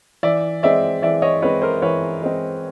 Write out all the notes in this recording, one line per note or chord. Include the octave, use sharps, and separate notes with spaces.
E3 D5 E5
G#3 C4 D5 E5
E3 D5 E5
C#5 D#5
G#3 C4 B4 C#5
A#4 C5
E3 B4 C#5
G#3 C4